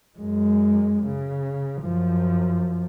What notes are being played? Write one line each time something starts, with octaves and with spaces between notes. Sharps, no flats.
F#2 G#3
C#3
F#2 F3